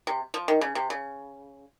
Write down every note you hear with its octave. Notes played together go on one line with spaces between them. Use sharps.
C3
F3
D#3
C#3
C3
C#3